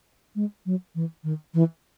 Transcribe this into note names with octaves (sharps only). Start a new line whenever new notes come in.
G#3
F#3
E3
D#3
E3